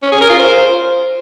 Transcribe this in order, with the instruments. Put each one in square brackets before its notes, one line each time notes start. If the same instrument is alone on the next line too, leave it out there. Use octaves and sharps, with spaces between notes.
[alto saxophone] C#4
G#4
A#4
F4
C5